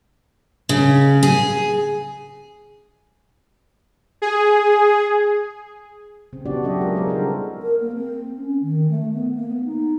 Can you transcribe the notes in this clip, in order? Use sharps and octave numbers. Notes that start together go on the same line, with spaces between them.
C#3
G#4
G#4
C#3 C4
B3 C4 D4 F#4 G4 D5
F#3 A4 D#5 E5
G#3 F4 G#4 A#4
G#3 B3 A4 A#4 C5
C#3 G3 D#4 A4 A#4
A#4
A#3
C4
C#4
D#3
A3
B3
A#3
B3
D#4